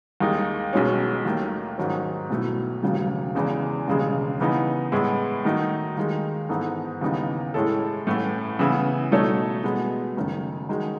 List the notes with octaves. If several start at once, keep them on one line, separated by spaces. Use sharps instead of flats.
D#2 D#3 G#3 D#4
B1 B2 G#3 C#4
D#2 D#3 A3
G#2 D#3 F#3 C#4
B1 B2 A3 E4
E1 D#2 C#3 F#3 A3
E2 C#3 E3 G#3
E1 D#2 C#3 G#3
C#3 E3 B3 D#4
A2 G#3 B3 E4
D#3 A3 D#4 F#4
D#2 D#3 G#3
G#2 E3 B3 D#4 A4
D#2 C#3 E3 B3 D#4
A2 G#3 C#4 E4 A4
A1 A2 E3 A3
C#3 E3 B3 E4
B2 A3 D#4 A4 C#5
B2 G#3 B3
F#1 F#2 D#3 A3
D#3 G#3 D#4 F#4